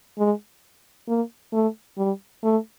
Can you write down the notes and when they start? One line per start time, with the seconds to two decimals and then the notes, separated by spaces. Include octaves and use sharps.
0.18 G#3
1.08 A#3
1.53 A3
1.98 G3
2.43 A3